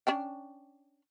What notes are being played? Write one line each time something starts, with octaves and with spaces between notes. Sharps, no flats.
C#4 D4 G5